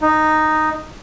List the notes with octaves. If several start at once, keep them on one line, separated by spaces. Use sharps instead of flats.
D#4